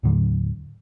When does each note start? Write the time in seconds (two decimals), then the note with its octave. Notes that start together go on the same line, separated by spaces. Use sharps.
0.03 D#2 A2 D3 F#3